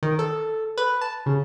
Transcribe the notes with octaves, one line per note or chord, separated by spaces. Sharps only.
D#3
A4
B4
A5
C#3